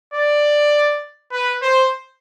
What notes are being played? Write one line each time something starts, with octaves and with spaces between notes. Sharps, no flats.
D5
B4
C5